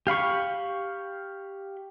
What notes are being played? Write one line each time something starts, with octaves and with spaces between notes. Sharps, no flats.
G4 F5 B5 C#6